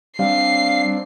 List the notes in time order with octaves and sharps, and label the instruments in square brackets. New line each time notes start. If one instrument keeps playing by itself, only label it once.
[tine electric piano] G3 [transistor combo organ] C4 D4 [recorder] F5 [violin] C7